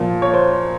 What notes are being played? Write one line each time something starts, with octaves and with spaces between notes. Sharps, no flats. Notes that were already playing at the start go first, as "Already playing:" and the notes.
Already playing: A#2 F3
C#5
C5